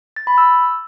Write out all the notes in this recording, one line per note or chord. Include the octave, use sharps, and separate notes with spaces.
A6
B5
E6